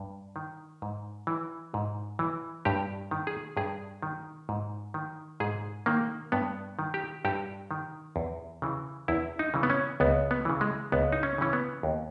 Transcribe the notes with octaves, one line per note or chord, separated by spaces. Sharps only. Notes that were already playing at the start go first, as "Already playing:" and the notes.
Already playing: G2
D#3
G#2
E3
G#2
E3
G2 G4
D#3
G#4
G2 G#4
D#3
G#2
D#3
G#2 G#4
D#3 A#3
G2 B3
D#3
G4
G2 G4
D#3
E2
C#3 E3
E2 E4
D#4
C#3 E3
B3
C#4
C#2 B3
B3
C#3 E3
G#3
C#2 B3
D#4
C#4
C#3 E3 C#4
B3
D#2